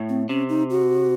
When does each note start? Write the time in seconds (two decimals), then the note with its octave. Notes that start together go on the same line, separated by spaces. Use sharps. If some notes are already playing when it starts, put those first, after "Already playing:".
Already playing: A2
0.09 C4
0.29 C3 C#4
0.49 D#4
0.70 F#4